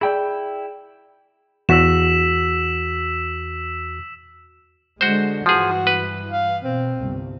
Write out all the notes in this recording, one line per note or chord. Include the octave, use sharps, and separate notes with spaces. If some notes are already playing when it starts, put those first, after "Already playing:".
E4 G#4 D5 G5 E6
E2 F#4 E6 B6 E7
D3 G#3 F#4 C5
G2 E3 F3 F#4 G#4
B4
F5
B2 C4
G1 C2